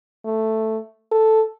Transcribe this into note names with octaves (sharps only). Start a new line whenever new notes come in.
A3
A4